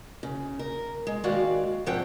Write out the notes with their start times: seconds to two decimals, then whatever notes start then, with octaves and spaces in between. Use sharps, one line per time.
0.23 C#3
0.59 A#4
1.07 G#3
1.24 D#2 G#3 F#4 D5 F5
1.86 G#2 D3 F3 C4 F#5 G5